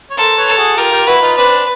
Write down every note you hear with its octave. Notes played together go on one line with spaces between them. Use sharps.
C#5
A4 A#4 C5
B4 C#5
A4
F#4 G#4
F4 G4 A#4
F4 G4
E4 F#4 B4
D#4 F4
C4 D4 B4